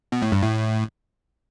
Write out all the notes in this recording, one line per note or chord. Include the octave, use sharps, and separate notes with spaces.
B2
A2
G2
A2